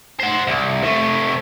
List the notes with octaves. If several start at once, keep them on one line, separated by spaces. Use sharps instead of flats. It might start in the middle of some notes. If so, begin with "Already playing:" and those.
C5 F#5
C2
C3 A3